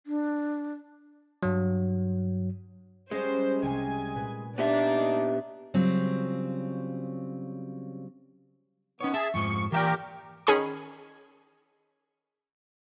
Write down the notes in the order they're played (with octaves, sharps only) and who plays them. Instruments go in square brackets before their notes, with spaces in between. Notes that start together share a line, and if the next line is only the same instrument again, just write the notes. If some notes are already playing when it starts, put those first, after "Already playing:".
[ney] D4
[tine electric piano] G2 F#3
[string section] G3 C5 [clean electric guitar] G#3 [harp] C#4 F#5
[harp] C2 G3 [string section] G#5
[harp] A#2 B4
[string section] A#3 D4 D#4 [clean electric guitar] B3 G4 E5
[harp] D#5
[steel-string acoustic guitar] C#3 F#3 G3 C4 F4
[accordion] D#3 B3 [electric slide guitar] C#4 C#5
[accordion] G#4 A5 [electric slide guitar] E5
[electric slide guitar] F2 G#2 F3 [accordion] C#6
[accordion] A#2 G4 A#4 [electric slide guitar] E3 E5 G5
[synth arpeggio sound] D#3 C#4 G#4 G#5 B5 C#6